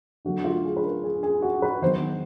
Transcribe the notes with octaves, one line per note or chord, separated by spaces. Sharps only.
D3 F#3 A3 F#4
F4
G#4
B4
A#4
G#4
G#4
F#4
B4
D#3 F#3 B3 C5